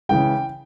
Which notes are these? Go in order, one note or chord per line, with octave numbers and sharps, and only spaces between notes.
C#3 E3 G#3 G5